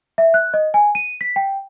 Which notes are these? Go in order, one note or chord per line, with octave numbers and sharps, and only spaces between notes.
E5
F#6
D#5
G#5
D#7
B6
G5